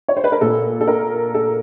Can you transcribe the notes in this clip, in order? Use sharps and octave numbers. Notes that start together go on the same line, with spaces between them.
C#5
C5
B4
A#4
A#2 A4
A4
A#4
A4